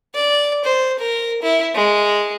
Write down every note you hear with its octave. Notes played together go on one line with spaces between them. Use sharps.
D5
C5
A#4
E4
G#3